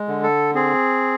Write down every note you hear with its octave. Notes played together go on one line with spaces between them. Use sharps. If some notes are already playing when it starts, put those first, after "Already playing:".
Already playing: G#3
D3
A4
C4 G#4